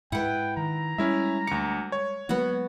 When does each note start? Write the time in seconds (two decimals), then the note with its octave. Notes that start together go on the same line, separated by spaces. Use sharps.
0.12 G#2 G#3 E4 B4 F#5 G5
0.57 D#3 A#5
0.98 G3 G#3 C#4 E4 E5
1.47 D2 D6 C#7
1.92 C#5
2.29 F#3 G#3 A#3 B3 F#4 F#5